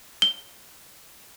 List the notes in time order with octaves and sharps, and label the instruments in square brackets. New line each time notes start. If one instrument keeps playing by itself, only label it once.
[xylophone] G7